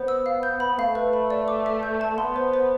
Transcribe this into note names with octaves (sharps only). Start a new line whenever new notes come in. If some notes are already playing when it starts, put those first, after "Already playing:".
Already playing: B3 C5
E6
F5
G6
B5
A3 F5
B4
B5
D5
D6
E5
G6
A5
B3 C6
C5
C5